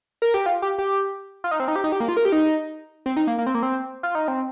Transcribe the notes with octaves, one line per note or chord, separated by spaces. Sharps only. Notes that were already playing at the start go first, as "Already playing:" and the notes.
A#4
G4
F4
G4
G4
F4
D#4
C4
D#4
G4
D#4
G4
A#3
F4
A#4
G4
D#4
C4
D#4
A#3
A#3
C4
A#3
C4
F4
D#4
C4